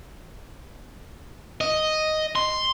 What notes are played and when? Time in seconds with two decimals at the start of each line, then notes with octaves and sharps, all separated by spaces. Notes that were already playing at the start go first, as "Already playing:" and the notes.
1.61 D#5
2.35 C6